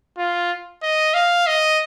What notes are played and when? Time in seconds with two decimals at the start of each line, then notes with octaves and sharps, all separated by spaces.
0.18 F4
0.83 D#5
1.14 F5
1.47 D#5